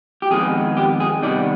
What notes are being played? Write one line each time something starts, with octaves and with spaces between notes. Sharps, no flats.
G4
F2 D#3 G#3 B3 G#4
G4
G#4
C3 D#3 G3 B3 D#4 D5